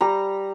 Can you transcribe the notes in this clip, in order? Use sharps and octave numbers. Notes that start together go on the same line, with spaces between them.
G3 A#5